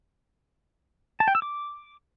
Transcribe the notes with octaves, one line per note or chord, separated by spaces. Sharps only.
A5
G5
E6
D6